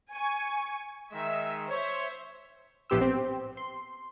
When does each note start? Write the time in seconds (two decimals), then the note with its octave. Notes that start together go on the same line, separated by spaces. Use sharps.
0.12 G#5 C#6
1.12 D#3 G#3 D#4 E5 E6
1.69 C5 C#5 E5
2.90 A#1 A2 B3 G4 C6 E6
3.01 C4
3.57 C6